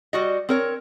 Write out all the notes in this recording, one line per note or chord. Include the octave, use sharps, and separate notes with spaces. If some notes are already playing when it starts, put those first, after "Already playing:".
G3 F#4 D#5
C4 A#4 C#5